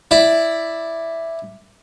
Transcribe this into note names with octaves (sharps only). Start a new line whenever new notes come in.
E4 D5